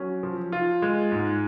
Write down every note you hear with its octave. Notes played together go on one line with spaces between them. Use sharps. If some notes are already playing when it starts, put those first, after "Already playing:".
Already playing: F#3 C#4
F3
F4
G#3
G#2